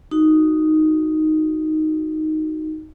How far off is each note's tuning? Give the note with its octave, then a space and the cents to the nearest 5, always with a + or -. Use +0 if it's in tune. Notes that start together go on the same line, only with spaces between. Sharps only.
D#4 +0 F#4 +0